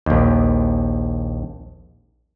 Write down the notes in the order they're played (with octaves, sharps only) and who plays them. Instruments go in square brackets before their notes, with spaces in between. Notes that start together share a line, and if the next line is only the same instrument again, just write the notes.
[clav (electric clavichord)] A#1 D#2